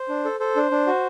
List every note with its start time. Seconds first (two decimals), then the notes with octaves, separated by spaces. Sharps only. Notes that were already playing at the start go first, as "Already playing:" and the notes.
Already playing: C5
0.09 D4
0.25 A4
0.40 A4 C5
0.56 D4
0.71 D4
0.87 F#4